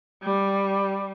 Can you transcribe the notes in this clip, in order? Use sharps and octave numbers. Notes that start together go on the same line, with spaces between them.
G3